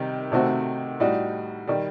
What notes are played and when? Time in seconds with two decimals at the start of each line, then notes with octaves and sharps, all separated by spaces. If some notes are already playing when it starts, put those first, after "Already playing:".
Already playing: C3 D#3 G3 C4
0.32 C3 D#3 A3 C4 F#4
1.00 A2 G3 D#4 F#4
1.67 D#3 G3